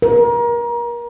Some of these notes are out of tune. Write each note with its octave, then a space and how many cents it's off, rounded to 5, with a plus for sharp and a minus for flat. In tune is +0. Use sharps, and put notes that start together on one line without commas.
A#4 +30